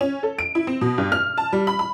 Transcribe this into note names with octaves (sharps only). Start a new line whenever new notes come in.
C#4
A4
D7
E4
C4
B2
G2
F6
A5
G3
B5
B5